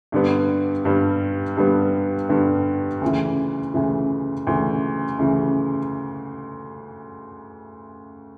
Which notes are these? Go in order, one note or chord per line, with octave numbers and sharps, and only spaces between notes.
G2 D3 G3 B3
G2 D3 G3 B3
G2 D3 G3 B3
G2 D3 G3 B3
D2 C#3 E3
D2 C#3 E3
D2 C#3 E3
D2 C#3 E3